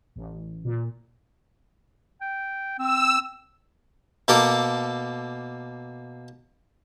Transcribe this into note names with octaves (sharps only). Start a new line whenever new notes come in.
A1
A#2
G5
C4 E6
B2 A#3 A4 A#4 D6